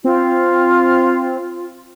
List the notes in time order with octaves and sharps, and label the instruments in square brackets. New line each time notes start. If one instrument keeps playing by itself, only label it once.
[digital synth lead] C4 [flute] F4